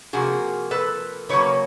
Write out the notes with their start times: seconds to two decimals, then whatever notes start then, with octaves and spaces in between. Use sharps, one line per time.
0.13 C3 F3 A#3 F#4 G#4
0.71 A4 B4
1.29 C#3 F#3 A#3 B4 C#5